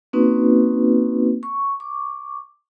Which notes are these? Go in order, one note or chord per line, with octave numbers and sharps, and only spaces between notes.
A#3 C4 C#4 D#4 F#4 B4
C#6
C#6 D6